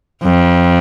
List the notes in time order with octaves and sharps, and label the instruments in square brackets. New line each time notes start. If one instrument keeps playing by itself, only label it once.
[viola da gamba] F2